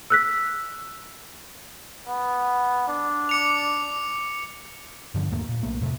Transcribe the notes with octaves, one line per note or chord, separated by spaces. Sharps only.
E6 F#6 B6
B3
D4
D6 C#7 F7
G2 D3 F3
D#2 G#2 A3 A#3
A#2
B1 A3 A#3
F2 A2 C3 A3